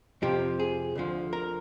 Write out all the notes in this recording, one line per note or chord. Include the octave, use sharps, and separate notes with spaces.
F2 C3 F3 G4
G#4
D2 D3 F3
A#4